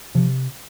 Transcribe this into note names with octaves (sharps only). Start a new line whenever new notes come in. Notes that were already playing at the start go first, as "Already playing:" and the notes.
C3 F3